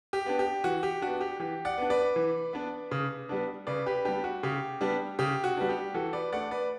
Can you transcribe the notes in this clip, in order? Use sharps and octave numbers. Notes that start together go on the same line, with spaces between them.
G4
B3 D4
G4
E3 F#4
G4
B3 D4 F#4
G4
E3 G4
D5 F#5
B3 D4
B4 D5
E3
B3 D4
C#3
G3 B3 D4
C#3 B4 D5
G4 B4
G3 B3 D4 G4
F#4
C#3 G4
G3 B3 D4
C#3 G4
F#4
G3 B3 D4
G4
E3 F#4 A4
B4 D5
A3 D4 D5 F#5
B4 D5